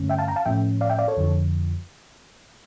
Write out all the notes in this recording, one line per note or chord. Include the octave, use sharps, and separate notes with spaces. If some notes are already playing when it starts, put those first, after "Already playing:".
Already playing: G2 D3 A3 C#4
E5 G5
F5 A5
G5 A#5
F5 A5
A2 F3 A3 C#4 E5 G5
D5 F5
E5 G5
D5 F5
A4 C#5
F2 D3 F3